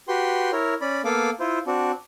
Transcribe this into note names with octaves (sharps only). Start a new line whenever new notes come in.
F#4 G4 B4 G5 C6
E4 A#4 C#5
C#4 D5 B5
A#3 B3 A4 F5 D6
E4 F4 C5
C4 D4 F#4